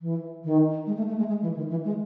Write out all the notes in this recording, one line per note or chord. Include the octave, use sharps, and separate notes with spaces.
E3
D#3
G#3
A3
A3
G#3
G#3
E3
D#3
E3
G#3